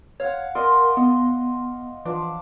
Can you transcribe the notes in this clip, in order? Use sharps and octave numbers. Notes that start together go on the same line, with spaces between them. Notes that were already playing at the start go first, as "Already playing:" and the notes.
C#5 F5 F#5
A#4 D5 D#5 C6
B3 D#5
E3 F3 D4 D6